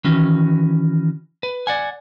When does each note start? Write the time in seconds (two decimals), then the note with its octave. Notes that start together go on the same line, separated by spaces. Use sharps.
0.04 D#3 E3 C#4 F#4
1.43 B4
1.67 D5 F#5 G#5